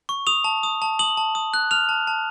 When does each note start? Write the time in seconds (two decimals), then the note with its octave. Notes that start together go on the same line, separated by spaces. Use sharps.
0.09 C#6
0.27 D#6 F7
0.44 A5
0.63 D#6
0.82 A5
0.99 D#6 F#7
1.17 A5
1.35 D#6
1.54 F#6
1.71 F6 F7
1.89 A5
2.07 A5